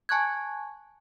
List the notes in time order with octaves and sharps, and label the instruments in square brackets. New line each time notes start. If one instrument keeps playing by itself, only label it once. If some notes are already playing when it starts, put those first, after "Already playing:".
[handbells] G#5 A5 C#6 F#6 G#6